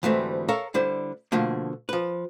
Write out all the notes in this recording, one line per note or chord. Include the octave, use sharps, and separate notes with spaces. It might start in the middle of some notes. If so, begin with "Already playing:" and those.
D2 G#2 E3 G3 A3 C4
A4 A#4 C#5 E5 F5 A#5
D3 G3 E4 C5
B2 D3 F3 A3 A#3
F3 B4